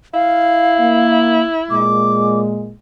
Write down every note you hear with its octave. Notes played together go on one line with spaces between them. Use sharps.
E4 F5
A#3
A#2 G#3 D6